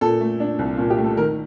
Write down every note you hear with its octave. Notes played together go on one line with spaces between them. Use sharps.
A#2 A4
A3
D4
C2
A#2 F4
G4
A3
A4
D#3 A#4